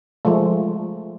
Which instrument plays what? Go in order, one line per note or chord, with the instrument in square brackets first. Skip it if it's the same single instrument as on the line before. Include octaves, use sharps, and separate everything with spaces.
[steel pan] F3 G#3 A3